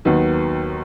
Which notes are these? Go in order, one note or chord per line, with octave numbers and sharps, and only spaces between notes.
D#2 D#3 F#3 B3